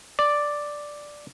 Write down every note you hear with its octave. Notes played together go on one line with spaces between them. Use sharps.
D5